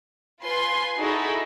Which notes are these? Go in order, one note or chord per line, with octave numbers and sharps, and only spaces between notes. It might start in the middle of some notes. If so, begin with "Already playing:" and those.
F4 B4 G#5 C6
D#4 E4 F#4 G#4 A4 D#5